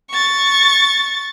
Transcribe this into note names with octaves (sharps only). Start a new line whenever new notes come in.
C#6 A6